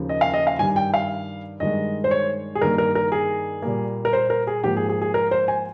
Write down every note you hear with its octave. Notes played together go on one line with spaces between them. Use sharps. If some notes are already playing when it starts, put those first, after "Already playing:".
Already playing: D#2 C#3 F3 A#3
D#5
F5
D#5
F5
G2 D#3 G3 G#5
G5
F5
G2 D#3 G#3 D#5
C5
C#5
G#4
G2 D#3 A#3 A#4
A#4
A#4
G#4
A#2 G3 A#3
A#4
C5
A#4
G#4
G#2 F3 A#3 G4
G#4
G#4
G#4
A#4
C5
G#5